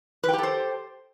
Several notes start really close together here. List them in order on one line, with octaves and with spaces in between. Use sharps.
B4 G5 G4 A4 C5